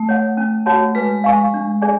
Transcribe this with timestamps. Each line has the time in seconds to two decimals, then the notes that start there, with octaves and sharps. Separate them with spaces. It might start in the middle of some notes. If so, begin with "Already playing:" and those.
Already playing: A3
0.09 C#5 F#5
0.37 C#4
0.66 F#4 C#5 F#5 A5
0.95 G#3 B4
1.24 F5 G#5 C#6
1.54 D4
1.82 G#4 D5 G#5